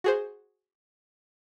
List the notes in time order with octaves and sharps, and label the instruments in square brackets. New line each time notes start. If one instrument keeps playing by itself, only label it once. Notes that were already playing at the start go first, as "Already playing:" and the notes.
[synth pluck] F#4 G#4 C5